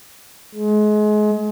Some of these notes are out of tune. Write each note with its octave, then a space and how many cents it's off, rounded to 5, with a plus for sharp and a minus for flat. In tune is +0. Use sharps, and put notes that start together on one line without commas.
G#3 +30